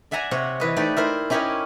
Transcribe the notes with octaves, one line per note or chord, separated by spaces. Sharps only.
D5 E5 F#5 G#5 A#5
C3 C#5 F#5
E3 B4 D#5
A3 D#4 G4 D5
E4 A#4 C5
C#4 E4 G4 A#4 C#5 D#5